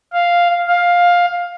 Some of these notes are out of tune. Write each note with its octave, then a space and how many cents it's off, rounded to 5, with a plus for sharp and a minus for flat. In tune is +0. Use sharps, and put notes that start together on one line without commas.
F5 +0
F5 +10